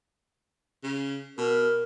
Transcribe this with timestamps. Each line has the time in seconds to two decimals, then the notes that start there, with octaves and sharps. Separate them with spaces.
0.83 C#3
1.38 B2 A#4